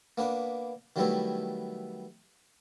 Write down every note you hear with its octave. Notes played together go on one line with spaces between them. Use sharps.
A#3 B3 D4 B4
D#3 F#3 G3 A3 B3 E4